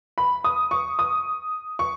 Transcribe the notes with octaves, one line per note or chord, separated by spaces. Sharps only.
B5
D#6
C#6
D#6
C#6